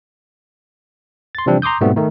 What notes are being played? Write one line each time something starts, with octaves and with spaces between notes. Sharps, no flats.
C6 A6
C3 E3 F3 G3 C4 D4
A#5 C6 D6 D#6 G6
G#2 B2 G3 A3 B3 C4
D#3 A3 D#4